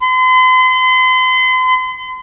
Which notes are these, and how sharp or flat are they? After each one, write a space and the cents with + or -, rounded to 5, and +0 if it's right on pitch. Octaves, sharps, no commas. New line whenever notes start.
C6 -40